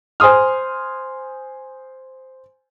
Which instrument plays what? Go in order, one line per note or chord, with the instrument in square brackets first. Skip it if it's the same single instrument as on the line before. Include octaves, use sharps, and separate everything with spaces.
[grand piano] C5 G#5 C6 D#6 F6